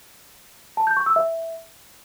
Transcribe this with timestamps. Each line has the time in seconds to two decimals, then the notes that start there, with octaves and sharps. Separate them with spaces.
0.77 A5
0.87 G6
0.97 C#6
1.06 E6
1.16 E5